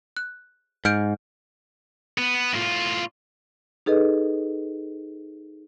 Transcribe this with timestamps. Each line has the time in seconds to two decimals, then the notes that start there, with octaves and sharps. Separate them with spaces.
0.17 F#6
0.85 G#2 F6 G6 D7
2.18 B3
2.54 A2 F4
3.86 D#4 G#4 A4 B4 D#5